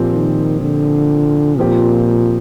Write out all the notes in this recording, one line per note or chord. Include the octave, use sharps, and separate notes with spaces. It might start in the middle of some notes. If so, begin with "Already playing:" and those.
Already playing: A#2 F3 C4 G4
D#3
D3
A#2 F3 C4 G4